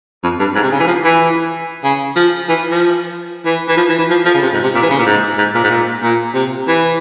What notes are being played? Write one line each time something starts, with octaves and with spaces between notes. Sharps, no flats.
F2
G2
G#2
C3
C#3
E3
F3
E3
C#3
F3
E3
F3
E3
E3
F3
E3
E3
F3
F3
C#3
C3
G#2
C3
A#2
E3
C#3
A#2
G#2
G#2
A#2
G#2
A#2
A#2
C3
E3